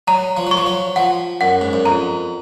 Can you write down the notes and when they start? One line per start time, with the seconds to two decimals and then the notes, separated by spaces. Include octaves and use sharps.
0.08 F#3 A#5
0.37 F3
0.47 F#3 C#6
0.57 F3
0.66 F#3
0.96 F3 F#5
1.41 F#2 F#5
1.61 G#2
1.73 F#2
1.85 F2 A#5